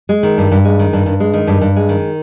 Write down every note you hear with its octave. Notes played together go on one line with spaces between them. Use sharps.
G#3
D#3
G2
G2
G#3
D#3
G2
G2
G#3
D#3
G2
G2
G#3
D#3